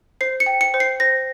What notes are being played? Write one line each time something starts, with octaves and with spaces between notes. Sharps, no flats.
C5 C7
C#7
G5
C#7
C5
C7
C5 A#6